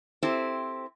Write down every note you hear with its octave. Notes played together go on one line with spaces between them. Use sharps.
C4 E4 G4 A4 C5